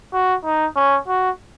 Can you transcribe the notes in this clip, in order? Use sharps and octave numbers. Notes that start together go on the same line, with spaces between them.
F#4
D#4
C#4
F#4